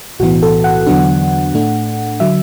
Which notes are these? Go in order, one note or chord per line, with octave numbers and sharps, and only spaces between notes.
B1 A2 E3 B3 F#4
A4
F#5
E2 D3 F#3 B3 D4
A2 A3 D4
D3 F#3 E5